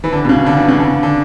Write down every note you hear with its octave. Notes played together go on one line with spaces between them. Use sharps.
E3
D3
B2
C#3
D3
E3
C#3
D3
D3